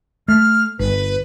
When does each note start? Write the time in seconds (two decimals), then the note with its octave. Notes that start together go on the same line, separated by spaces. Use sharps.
0.28 A3 F6
0.79 G1 B4